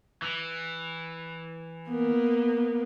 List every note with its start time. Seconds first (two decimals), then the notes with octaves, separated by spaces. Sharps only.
0.22 E3
1.89 A#3 B3